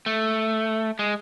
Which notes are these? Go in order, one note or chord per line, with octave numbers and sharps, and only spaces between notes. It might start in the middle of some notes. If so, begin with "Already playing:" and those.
A3
G#3